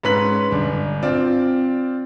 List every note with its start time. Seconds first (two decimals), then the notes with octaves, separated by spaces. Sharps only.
0.03 G#2 C#4 B4 B6 F#7
0.51 G1 D4
1.03 C4 F4 D5